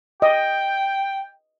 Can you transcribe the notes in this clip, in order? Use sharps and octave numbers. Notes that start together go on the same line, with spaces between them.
D#5 G5